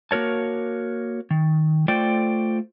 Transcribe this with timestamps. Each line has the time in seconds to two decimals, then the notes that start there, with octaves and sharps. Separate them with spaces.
0.11 A#3 F#4 A#4 C#5 A5
1.30 D#3
1.88 A3 F4 A4 C5 D5 G5